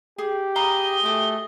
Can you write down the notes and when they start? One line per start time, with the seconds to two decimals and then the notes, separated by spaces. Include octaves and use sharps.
0.18 G4 G#4
0.56 G#4 D#5 F5 A#5 B5 G7
1.03 A3 F#4 G4